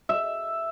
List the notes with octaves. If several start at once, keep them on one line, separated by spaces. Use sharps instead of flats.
E5